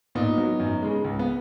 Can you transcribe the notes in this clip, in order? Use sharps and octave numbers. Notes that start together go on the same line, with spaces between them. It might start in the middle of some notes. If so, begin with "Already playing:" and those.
A#2 B3 D#4
F#3
F#2
C#3 G#3
C#2
B3